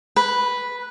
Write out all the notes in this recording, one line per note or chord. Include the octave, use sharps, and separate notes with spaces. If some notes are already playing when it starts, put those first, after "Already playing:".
B4